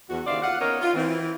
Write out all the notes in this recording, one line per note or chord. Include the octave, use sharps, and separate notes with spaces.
E2 F#4
D#2 C#3 C5 D5 E5 F5
F4 F#4 F5 F#5
B3 C#4 D#4 A#4 C#5 D#5
F4
E3 C4